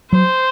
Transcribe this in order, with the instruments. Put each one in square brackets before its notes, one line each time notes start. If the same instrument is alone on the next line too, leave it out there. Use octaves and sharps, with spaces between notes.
[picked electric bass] F#3 [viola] C5